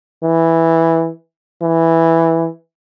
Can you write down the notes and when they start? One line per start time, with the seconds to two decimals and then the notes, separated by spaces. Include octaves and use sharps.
0.23 E3
1.62 E3